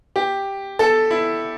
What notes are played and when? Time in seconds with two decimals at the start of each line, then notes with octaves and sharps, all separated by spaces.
0.16 G4
0.79 A4
1.11 E4